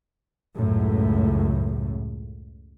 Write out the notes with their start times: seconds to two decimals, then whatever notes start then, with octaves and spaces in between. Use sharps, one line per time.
0.57 C#2 F#2 A2